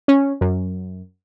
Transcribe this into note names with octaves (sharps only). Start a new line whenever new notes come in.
C#4
F#2